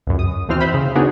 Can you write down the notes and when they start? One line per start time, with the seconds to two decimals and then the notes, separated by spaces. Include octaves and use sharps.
0.07 C#2 F#2
0.19 D#6
0.49 D#2 B2 E3 C4 C5 F6
0.60 B4 C5 E5 B5
0.74 C#3
0.95 B3 D4 D#4 F#4 G#4 C#5